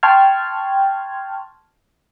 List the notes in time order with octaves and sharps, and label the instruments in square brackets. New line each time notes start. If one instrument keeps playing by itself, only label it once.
[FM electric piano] G5 A5 C6 C#6 F6 G#6